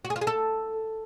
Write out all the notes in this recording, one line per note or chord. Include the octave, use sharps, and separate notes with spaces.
F#4
G#4
F4
G#4
A4